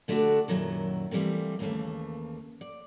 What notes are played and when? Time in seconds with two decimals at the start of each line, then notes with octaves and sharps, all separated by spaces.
0.08 D3 A3 D4 D#4 F#4 G4
0.48 F#2 A#2 D#3 F#3 E4
1.11 E3 G3 A3 A#3 C4
1.59 D#2 C#3 E3 F#3 A3 A#3
2.61 D5